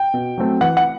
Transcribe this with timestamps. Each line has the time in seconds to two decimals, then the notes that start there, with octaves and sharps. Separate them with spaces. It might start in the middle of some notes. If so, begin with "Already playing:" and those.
Already playing: G5
0.14 B2
0.38 F#3 A3 C4
0.61 E3 F#5
0.77 F#5